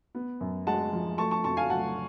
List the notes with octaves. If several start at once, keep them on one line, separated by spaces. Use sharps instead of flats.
B3
F#2
G#3 F#5 A5
F3
A3 A5 C#6
A5 C#6
F2 A5 C#6
F5 G#5
F#3 F#5 A5